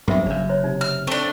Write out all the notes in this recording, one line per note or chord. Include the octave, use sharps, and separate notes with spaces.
G2 F#3 B3 C4 G#4 A#4 C5 E5
F#1 F#2 C#3
C5 C#5 A#5
C3 D#4
F6
A3 C4 D4